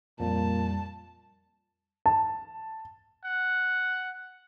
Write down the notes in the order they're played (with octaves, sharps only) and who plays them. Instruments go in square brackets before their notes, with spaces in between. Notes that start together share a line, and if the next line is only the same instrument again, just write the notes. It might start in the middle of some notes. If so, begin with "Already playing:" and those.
[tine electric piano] F2 [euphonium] A#2 [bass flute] G3 [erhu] A5
[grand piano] A5
[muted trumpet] F#5